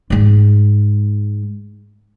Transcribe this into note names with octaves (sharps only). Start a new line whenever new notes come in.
G#2 G#3